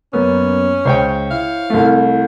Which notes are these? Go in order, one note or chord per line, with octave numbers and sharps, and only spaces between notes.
F#2 A#3 B3 C#4
C#2 C5 C#5 G5
E4 F5
C2 A3